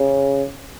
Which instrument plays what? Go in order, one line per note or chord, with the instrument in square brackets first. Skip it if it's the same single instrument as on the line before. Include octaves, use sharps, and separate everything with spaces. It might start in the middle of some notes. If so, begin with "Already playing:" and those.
Already playing: [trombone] C#3